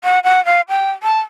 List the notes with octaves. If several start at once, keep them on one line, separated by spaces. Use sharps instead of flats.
F#5
F#5
F5
G5
A5